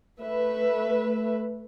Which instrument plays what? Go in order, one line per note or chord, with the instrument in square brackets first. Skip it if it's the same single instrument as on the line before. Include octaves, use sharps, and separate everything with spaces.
[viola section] A3 B4 E5